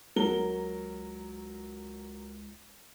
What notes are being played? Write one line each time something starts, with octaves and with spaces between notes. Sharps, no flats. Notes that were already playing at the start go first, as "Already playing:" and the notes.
C#2 F#3 A#4 G7